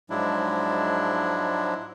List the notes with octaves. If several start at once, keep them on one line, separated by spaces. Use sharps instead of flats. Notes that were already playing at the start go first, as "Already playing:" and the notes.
G#2 F3 F#3 G#3 D4 E4